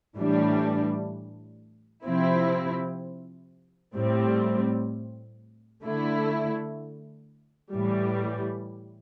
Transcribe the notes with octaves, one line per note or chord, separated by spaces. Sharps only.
A2 E3 G3 D4
C3 F3 C4 E4
A2 G3 C4
D3 A3 E4
A2 E3 G3